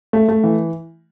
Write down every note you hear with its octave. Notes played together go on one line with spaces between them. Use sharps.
A3
A3
E3